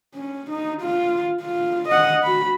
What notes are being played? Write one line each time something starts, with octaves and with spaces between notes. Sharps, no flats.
C#4
D#4
F4
F4
D#5 F#5
F#4 B5